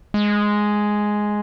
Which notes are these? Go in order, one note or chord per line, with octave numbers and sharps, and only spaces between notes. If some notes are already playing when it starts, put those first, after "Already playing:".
G#3